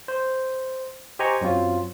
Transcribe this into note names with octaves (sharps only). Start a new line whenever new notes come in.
C5
G4 C5 D#5 G#5 A#5 C#6
F#2 F#3 C4 F4